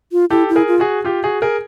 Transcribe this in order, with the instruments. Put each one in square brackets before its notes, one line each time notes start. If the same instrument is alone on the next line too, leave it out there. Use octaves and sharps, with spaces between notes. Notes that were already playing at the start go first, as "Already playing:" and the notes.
[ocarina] F4
[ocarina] E4 [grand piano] G4 A4
[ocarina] E4
[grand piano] G#4 A#4
[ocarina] F4
[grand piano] F#4 G#4
F4 G4
F#4 G#4
G#4 A#4